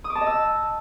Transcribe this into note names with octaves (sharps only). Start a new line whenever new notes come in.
D#6
D6
A5
D#5
E6